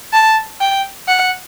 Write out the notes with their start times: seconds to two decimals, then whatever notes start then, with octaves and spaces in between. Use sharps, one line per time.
0.13 A5
0.61 G5
1.08 F#5